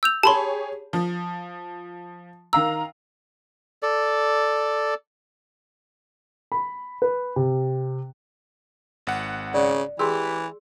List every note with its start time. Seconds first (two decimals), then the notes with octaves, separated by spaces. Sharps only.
0.03 E6 G6 F7
0.23 G4 G#4 C#5 A5 B5 C6
0.93 F3
2.53 D#3 F5 A#5 E6
3.83 A4 D5
6.52 B5
7.02 B4
7.36 C3
9.07 G#1 F#5
9.54 C#3 D5
9.99 E3 G4 G#4 C6 E6